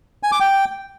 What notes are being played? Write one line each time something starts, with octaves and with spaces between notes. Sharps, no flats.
G#5
D6
G5